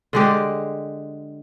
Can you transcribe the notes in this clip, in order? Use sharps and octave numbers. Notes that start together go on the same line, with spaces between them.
D3 G#3 G4